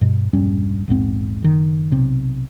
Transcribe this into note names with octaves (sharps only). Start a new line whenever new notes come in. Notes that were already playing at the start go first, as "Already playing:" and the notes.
G2 B2
E1 A#1 G2 C#4
A#1 E2 G#2 C4
F#1 D#3
B1 C3